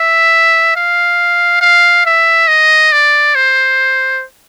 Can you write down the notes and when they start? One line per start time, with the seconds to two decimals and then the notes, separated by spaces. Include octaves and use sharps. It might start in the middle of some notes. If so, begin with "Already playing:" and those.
Already playing: E5
0.76 F5
1.61 F5
2.06 E5
2.48 D#5
2.92 D5
3.35 C5